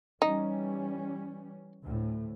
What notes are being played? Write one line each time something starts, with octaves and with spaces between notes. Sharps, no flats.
E3 G3 C#4 D#4
D2 A2